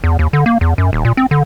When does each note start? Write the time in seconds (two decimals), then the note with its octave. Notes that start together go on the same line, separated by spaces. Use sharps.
0.04 E2
0.19 D#2
0.33 D3
0.46 A#3
0.61 E2
0.78 F#2
0.93 D#1
1.05 A#2
1.17 C4
1.31 D3